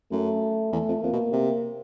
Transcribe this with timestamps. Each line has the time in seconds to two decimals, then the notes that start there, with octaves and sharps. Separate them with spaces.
0.11 F#2 A3
0.73 E2 A3
0.88 F2
1.03 F2 A#3
1.13 B2
1.33 C3